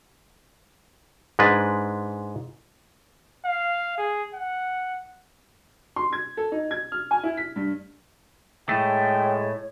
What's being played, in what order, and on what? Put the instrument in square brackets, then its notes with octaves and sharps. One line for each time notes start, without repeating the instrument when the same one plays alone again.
[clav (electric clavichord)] G#2 G#3 D4 B4
[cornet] F5
G#4
F#5
[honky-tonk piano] C6
G#6
A4
D#4
G#6
F6
G#5
E4
B6
G2
[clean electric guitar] A2 A3 [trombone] G#3 [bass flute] C#5 [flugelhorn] G5